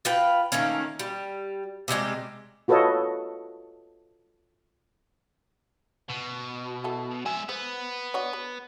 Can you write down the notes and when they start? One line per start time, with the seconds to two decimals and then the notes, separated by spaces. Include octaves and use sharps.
0.05 F4 B4 G5
0.52 D#3 A3 A#3 C#4
0.99 G3
1.88 C3 G3 G#3 G4
2.68 F4 F#4 A4 B4 C#5 D#5
6.09 B2
6.84 E3 A4
7.26 G#3 E5 G#5
7.49 B3 C5 B5
8.14 D4 F#4 C#5
8.33 B4